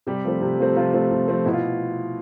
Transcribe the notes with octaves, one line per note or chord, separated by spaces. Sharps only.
C3 G3 G4
F3 A3 C4
C3
F3 A3 C4
C3 F3 F4
F3 A3 C4
C3
F3 A3 C4
B2 E4
F4